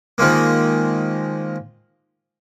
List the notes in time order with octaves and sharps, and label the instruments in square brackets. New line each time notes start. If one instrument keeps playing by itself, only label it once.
[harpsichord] D#3 F3 G#3 A#3